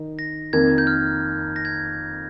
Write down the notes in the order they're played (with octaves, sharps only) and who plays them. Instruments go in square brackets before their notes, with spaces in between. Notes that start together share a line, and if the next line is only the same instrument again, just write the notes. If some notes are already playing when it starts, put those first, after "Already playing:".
Already playing: [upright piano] D#3 D#4
[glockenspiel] A#6
[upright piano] F2 D#3 A#3 [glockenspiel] G#6
[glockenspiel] G6
F6
A#6
G#6